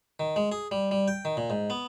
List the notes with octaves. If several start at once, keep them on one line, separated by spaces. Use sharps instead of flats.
D#3
G#3
G#4
G3
G3
G5
D#3
A#2
G#2
B3